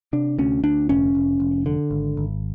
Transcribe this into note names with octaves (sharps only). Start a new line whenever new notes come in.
C3 D4
D2 C#4
D2 D4
F1 C#4
F1
F1
D3
G#1
G#1